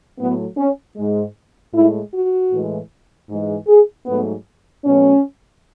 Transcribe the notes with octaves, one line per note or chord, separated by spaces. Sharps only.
A2 F#3 A3 B3
C#4
G#2 G#3
A2 G#3 E4
F#4
A2 E3 G#3
G#2 E3 G#3
G#4
G#2 F#3 A3 B3
B2 F#3 A3 C#4